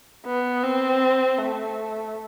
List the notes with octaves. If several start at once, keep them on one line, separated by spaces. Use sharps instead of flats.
B3
C4
A3